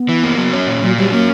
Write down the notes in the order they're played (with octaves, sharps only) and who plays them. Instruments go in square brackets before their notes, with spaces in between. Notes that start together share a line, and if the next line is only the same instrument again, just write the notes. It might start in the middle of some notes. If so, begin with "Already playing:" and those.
Already playing: [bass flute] B3
[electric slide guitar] E3
A#3
F#3
C#4
A#2
[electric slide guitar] A#2 [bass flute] F#3
[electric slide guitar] F#3 [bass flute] G3
[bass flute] A#3 [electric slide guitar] C#4